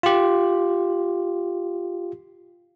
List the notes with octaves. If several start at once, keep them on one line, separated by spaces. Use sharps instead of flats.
F4 G4